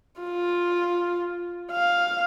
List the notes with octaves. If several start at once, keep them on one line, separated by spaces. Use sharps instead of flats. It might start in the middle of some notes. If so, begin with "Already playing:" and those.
F4
F5